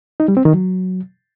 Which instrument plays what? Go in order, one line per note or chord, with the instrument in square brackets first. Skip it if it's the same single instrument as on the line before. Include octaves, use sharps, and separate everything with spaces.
[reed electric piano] D#4
G3
C4
D#3
F#3